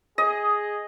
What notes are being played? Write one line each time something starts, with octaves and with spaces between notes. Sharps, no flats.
G#4 D#5